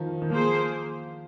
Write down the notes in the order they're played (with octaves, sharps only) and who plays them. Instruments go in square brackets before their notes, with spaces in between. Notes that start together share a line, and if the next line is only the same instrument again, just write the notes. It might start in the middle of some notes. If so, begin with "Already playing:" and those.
Already playing: [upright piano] D#3 F3 D#4
D#3
[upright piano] F3 [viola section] A#3 G#4 C5